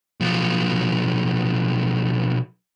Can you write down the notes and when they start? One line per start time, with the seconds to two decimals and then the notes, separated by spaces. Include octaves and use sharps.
0.20 B1 F3